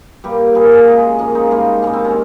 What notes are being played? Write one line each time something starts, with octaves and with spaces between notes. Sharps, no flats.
G2 G3 A#3 G4
A#2 G3 A#3 G#4
G#4
C#3 G#3 D#4
G#2 F3 A#3 C#4
D#4
G#2 G3 A#3 F4
G#2 D#3 G3 A#3 C#4
C4
C#4